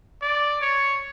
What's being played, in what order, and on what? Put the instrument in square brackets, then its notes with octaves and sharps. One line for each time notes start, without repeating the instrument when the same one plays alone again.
[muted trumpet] D5
C#5